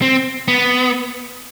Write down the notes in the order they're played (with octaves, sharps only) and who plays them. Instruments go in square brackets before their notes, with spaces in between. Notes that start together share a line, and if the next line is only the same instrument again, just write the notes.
[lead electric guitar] C4
B3